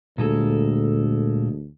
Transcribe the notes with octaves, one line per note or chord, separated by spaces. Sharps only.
D2 A#2 G#3 A4